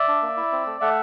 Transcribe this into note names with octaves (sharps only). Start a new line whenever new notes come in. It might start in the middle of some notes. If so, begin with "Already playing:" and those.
Already playing: D5 E5
D4
A#3
E4
C4
A3
A3 E5 F#5